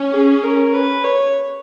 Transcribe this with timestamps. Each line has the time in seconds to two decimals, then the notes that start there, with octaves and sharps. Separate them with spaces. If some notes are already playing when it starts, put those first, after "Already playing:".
Already playing: C#4
0.12 G#4
0.43 A#4
0.73 B4
1.04 C#5